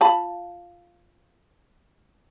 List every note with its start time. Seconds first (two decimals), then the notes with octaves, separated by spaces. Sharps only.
0.01 F4 A5 B5